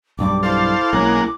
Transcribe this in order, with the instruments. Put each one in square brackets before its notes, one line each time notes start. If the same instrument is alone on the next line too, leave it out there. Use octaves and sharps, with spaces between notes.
[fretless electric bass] B1 G2 G3 [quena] D6
[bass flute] E4 [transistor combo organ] A4 C5 F5 [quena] D6
[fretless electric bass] B1 C#4 [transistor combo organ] G#3 A#3 F#5